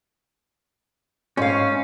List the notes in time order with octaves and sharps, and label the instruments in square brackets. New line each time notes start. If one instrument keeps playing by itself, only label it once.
[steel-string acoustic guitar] G#2 F5 [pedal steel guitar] C#4